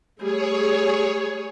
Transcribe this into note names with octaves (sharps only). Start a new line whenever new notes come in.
G3 A3 G#4 C#5